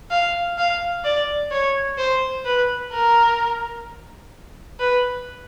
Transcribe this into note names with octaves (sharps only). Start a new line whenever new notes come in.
F5
F5
D5
C#5
C5
B4
A#4
B4